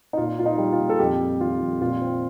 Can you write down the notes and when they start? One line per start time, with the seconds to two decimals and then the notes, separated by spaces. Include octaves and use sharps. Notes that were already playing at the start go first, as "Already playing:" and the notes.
0.13 D#4
0.17 A#2 F4
0.38 A#3 F4
0.46 D#4
0.58 G3
0.72 F4
0.79 A#2
0.90 A4
0.99 F2 G4
1.20 G3
1.40 D#3 F4
1.60 F2
1.81 A#2 F4
2.01 C4